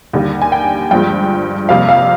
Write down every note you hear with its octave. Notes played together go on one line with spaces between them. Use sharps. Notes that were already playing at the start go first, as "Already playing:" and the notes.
D#2 D3 G3 A#3
G#5
G5
G2 F3 G#3 G5
F2 C3 G3 A#3 F5
F5